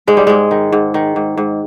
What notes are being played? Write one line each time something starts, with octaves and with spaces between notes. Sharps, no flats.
G#2 G#3
G3
G#2 G#3
D#3
G#2
D#3
G#2
G#2